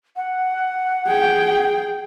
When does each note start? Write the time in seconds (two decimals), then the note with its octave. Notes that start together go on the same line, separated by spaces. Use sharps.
0.16 F#5
1.07 G#4 G5